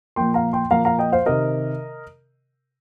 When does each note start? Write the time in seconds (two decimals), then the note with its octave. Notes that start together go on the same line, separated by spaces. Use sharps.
0.16 A#2 F3 A#3 G5 C6
0.34 F5 A#5
0.53 G5 C6
0.71 A#2 F3 A#3 F5 A#5
0.85 F5 A#5
0.99 D#5 G5
1.12 C5 F5
1.26 C3 D#3 A#4 D#5